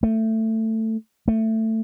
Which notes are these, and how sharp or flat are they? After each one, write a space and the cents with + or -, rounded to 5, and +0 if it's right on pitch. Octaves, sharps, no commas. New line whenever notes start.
A3 +15
A3 +15